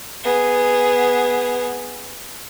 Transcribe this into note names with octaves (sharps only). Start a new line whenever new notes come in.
B3 G#4